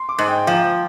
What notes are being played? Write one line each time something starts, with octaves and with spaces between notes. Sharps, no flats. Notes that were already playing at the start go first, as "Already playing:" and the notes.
Already playing: C6
D6
G#2
G5
F3 F5